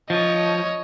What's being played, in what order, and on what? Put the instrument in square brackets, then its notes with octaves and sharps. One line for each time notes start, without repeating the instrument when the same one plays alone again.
[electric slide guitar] F3 [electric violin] C#5 D#5